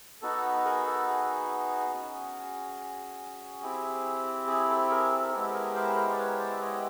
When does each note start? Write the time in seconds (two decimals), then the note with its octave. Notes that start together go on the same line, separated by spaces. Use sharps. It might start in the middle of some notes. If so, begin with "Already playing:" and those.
0.22 B3 D#4 F#4 A4
0.65 G#4 A#4
0.86 A4
1.08 G#4
1.93 C#4 F#4
3.62 C4 E4 G4
4.47 G#4
4.69 A4
4.90 G#4 A#4
5.11 A4
5.32 G#3 B3 E4 G4 A4
5.53 G#4 A#4
5.75 A#4 C5
5.96 A#4 C5
6.12 D5
6.18 B4 C#5
6.38 C5 D5
6.52 E5
6.60 C#5 D#5